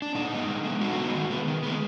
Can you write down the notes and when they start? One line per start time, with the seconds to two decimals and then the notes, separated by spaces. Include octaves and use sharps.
0.02 D4
0.15 A#2 D#4
0.32 G#3 B3
0.49 D3
0.64 G#3 B3
0.81 D3 D#4 F#4
0.98 G#3 B3
1.14 D#3
1.30 G#3 B3
1.47 D#3
1.63 G#3 B3